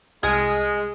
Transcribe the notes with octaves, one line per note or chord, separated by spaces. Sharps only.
C2 G#3 G#5 D#6 F6